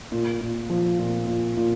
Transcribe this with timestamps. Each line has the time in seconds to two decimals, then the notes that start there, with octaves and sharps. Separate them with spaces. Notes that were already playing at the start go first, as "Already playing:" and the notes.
0.12 A#2
0.41 A#2
0.70 F3
0.99 A#2
1.27 A#2
1.57 A#2